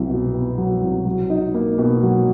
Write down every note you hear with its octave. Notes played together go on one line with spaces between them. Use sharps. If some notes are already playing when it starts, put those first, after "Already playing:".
Already playing: C2 F#3
B2
B3
F#3
C2
F#3
D#4
A#3
B2
F#3